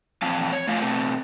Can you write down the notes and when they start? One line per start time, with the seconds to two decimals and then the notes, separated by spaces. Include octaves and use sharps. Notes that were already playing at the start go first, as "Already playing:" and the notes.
0.22 A#2 E3 F3 C4 F5 A5
0.53 C#5
0.67 A3 F4 C#5 F5
0.82 B2 A3 C4 A4